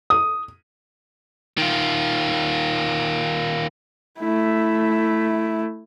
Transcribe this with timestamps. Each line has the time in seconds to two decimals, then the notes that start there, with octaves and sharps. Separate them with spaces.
0.10 D#6
1.58 D#3 F4
4.20 A3 E4